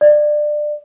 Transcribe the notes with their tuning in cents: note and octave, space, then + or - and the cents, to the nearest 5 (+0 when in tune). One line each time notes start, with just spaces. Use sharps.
D5 +25